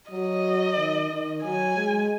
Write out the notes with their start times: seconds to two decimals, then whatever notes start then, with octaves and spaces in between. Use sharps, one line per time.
0.11 F#3 D#5
0.77 D#3
1.11 D#3
1.44 F#3 G#5
1.77 G#3